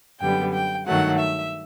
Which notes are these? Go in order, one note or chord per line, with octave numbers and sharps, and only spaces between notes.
F#2 D3 G3 B3 G5
G5
G2 D#3 F#3 A3 F#5
E5